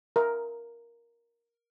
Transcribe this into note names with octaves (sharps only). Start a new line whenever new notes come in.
A#4 E5